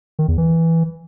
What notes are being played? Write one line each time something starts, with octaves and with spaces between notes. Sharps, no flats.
D#3
E2
E3